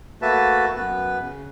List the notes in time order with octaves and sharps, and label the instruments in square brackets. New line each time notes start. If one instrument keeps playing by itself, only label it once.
[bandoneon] A3 A#3 F#4 B4 E5 A5
F#2 B3 B4
C#3